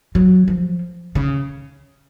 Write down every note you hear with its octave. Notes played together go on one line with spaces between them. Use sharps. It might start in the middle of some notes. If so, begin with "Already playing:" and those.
F#3
F3
C#3